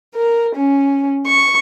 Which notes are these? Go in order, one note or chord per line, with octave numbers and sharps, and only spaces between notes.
A#4
C#4
C#6